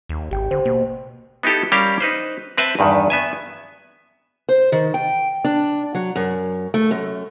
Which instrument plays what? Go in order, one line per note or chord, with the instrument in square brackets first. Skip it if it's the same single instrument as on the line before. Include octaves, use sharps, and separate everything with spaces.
[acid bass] D#2
[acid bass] G#1 [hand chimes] G4 G5
[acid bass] D3 [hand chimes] C5
[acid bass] B2 [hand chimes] A#3
[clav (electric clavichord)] B3 D#4 E4 G4 A4
G3 C#4 G4 A#4 F5
D#4 B4 C5
C4 B4 E5 G5 A5
E2 G2 D#3
B3 E5 G#5
[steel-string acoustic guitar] C5
D#3
G5
D4
F#3
F#2
A3
F#2